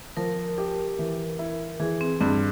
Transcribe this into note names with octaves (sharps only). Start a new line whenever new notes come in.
F3 A#4
G4
E3
E4
E3 G#4
C4
G2 C4